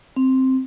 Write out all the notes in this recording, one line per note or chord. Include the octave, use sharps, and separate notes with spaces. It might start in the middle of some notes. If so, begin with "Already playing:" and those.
C4